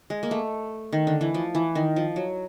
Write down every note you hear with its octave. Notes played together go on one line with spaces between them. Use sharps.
G#3
A#3
A3
D#3
D3
E3
F3
E3
D#3
F3
F#3